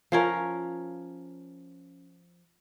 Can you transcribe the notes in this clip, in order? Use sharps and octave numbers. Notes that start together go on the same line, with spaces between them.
F3 C#4 A#4